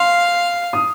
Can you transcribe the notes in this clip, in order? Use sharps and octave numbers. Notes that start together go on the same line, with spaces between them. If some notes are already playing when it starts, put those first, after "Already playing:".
Already playing: F5 C6
D#6